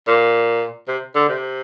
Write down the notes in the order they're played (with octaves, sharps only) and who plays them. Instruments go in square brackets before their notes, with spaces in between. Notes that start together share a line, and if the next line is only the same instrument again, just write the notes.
[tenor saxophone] A#2
C3
D3
C3